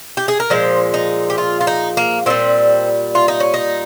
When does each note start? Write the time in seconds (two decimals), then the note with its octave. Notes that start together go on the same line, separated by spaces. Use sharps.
0.17 G4
0.28 G#4
0.40 A#4
0.50 A#2 F3 G#3 C5
0.94 D#4
1.30 G4
1.38 F4
1.61 F4
1.67 D#4
1.97 A#3
2.26 A#2 G3 C4
3.15 F4
3.28 D#4
3.40 C#4
3.54 D#4